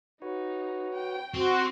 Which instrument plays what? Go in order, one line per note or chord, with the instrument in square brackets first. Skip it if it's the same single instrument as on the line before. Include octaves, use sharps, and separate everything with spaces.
[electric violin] D#4 [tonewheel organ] F#4 B4 C#5
[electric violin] G5
[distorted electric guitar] C4 [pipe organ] F#4